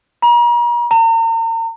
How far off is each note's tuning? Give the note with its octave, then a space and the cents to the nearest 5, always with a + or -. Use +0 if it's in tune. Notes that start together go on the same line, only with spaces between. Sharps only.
A#5 +40
A#5 -40